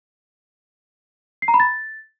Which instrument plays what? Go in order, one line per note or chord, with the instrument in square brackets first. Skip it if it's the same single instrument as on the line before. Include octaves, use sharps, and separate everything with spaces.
[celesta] C7
A#5
B5
A6